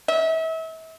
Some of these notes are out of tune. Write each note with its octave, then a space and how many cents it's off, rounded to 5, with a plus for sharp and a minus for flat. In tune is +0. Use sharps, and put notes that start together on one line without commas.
E5 -35